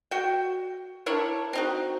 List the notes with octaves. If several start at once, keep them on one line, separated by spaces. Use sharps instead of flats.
F#4 G5
D4 E4 A#4 C#5
C4 D#4 F#4